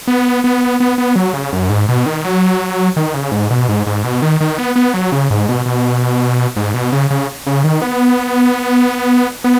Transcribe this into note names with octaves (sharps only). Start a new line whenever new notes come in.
B3
B3
B3
B3
F#3
C#3
F#2
G#2
B2
D#3
F#3
D#3
C#3
G#2
B2
G#2
G#2
B2
D#3
D#3
B3
B3
F#3
C#3
G#2
B2
B2
G#2
B2
C#3
C#3
C#3
D#3
B3
B3